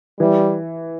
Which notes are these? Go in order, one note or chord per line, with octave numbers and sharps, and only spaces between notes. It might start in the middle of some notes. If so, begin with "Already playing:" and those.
E3 G3